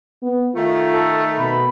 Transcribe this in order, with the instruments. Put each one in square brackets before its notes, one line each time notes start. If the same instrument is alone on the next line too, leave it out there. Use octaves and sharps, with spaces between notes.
[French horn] B3
[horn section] D#3 A3 [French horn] F4
[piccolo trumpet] A4
[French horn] B2 [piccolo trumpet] B5